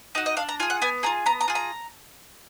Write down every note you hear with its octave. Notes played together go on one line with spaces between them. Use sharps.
D#4 F#4 D#5
D#5
D4 F5
A#5
F4 G#4 G#5
F#5
B3 G#5
F4 G#4 A#5
B3 A#5
A#5
F4 G#4
A#5